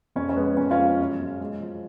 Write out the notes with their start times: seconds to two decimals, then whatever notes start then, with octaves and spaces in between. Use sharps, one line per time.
0.16 F2 C#4
0.29 C#4
0.36 G#3 B3
0.57 F2 C#4
0.71 C#4 F4
0.78 G#3
0.99 F#2
1.20 F#3
1.40 G#3
1.60 F3